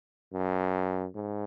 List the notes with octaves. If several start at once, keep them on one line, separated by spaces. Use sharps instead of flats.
F#2
G#2